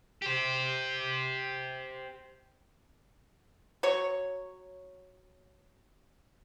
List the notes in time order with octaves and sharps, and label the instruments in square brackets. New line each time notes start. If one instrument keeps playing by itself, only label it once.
[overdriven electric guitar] G4 C5
[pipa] F#3 C#5